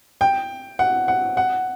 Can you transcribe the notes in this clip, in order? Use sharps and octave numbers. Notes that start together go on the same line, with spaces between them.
G5
F#5
F#5
F#5